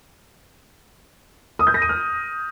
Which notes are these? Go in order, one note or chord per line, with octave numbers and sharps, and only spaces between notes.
D#6
G6
A#6
D#7
F6